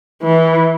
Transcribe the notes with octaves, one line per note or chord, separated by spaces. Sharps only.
E3